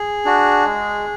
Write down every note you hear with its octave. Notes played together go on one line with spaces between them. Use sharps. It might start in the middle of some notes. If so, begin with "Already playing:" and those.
Already playing: G#4
D4 F#4
G#3